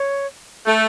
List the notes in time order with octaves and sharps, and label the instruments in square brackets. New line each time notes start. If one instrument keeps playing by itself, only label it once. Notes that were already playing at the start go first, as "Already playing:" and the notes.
Already playing: [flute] C#5
[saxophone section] A3